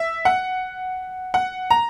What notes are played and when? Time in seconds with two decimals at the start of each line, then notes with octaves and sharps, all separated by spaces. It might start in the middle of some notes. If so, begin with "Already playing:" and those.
Already playing: E5
0.25 F#5
1.34 F#5
1.70 A#5